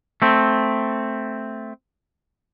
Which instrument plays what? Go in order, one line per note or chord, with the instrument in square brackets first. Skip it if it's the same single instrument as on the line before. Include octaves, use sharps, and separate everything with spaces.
[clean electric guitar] A3 C4